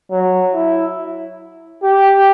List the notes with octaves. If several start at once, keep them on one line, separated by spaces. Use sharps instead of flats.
F#3
E4
G4